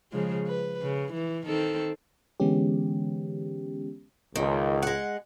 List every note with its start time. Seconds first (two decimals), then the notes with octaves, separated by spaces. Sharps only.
0.12 C#3 F3 G#3
0.47 B4
0.82 C#3
1.13 E3
1.46 D#3 C4 A4
2.40 D3 E3 G#3 B3 C#4 G4
4.36 C#2 D#3
4.82 G#3 F#5